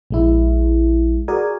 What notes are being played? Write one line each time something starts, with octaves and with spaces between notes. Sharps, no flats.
A#1 G#3 E4
F#4 G#4 A#4 D5 G#5